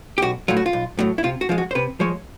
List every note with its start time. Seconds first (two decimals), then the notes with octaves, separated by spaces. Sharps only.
0.18 G4
0.22 B1 F#4
0.48 A2 F#3 F4
0.57 F#4
0.66 F4
0.73 B1
0.99 A2 F#3
1.18 E4
1.24 C3 F4
1.41 F#4
1.49 F3 G#3 F4
1.58 F#4
1.71 C5
1.75 C3 B4
2.00 F3 G#3 C#5